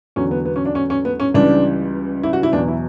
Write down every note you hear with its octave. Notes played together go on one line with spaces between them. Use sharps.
E2 D3 F#3 C#4
B3
B3
C#4
D4
C#4
C#4
B3
C#4
C#2 C#3 E3 G3 D4
E4
F#4
E4
E2 B2 F#3 D4
E4